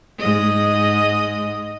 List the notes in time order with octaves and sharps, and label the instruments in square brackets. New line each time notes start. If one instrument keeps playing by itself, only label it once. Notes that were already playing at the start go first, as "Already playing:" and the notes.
[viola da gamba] G#2 D#5